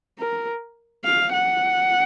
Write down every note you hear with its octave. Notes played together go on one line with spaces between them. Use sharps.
A#4
F5
F#5